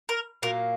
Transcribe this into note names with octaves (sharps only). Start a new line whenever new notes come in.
A#4
A#2 F#3 A#3 A#4